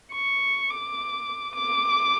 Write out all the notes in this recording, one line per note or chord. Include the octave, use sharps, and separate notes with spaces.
C#6
D6
D6